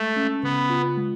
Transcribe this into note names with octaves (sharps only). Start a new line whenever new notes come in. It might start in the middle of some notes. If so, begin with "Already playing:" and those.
Already playing: G#3 A3
C#4
C#3 B3
F4
G#3